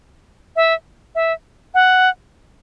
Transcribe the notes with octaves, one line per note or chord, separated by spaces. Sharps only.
E5
E5
F#5